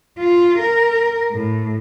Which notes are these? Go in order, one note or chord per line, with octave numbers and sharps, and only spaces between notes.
F4
A#4
A2